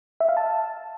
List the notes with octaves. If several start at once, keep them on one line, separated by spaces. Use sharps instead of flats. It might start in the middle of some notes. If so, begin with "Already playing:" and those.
E5
F5
A5